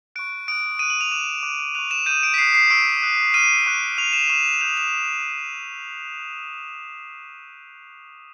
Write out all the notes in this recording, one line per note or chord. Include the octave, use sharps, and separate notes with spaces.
C#6 F#6 D7
D#6 F#6 D7
D#6 F#6 D#7
F#7
F7
D6 F#6 E7
D6 F#6
C#6 F#6 F7
E7
D#6 G6 D#7
D7
B6
D#6 F#6 C7
C7
C#6 E6 G6 D7
D#6 F#6
D6 F6 D#7
C#6 F#6
C#6 F6 F7
E7
C#6 F6 E7
D#6 G6 F7
E7